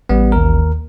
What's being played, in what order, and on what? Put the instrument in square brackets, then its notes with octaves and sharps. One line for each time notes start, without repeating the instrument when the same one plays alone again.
[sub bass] A1 [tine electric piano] G3 B3
[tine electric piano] D#2 A#4